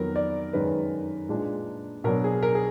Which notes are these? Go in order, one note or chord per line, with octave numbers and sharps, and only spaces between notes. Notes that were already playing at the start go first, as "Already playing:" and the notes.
Already playing: F2 D#3 F#3 B3 A#4
D5
F#2 D#3 G#3 B4
A#2 G#3 D4
B2 F#3 D4 A#4
G#4
A#4
G#4